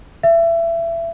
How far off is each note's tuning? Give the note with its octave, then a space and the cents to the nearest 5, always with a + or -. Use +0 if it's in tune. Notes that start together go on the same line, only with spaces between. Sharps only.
E5 +25